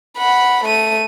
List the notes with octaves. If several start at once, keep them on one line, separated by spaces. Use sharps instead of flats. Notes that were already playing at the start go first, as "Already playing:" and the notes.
F#5 B5
A3 D#7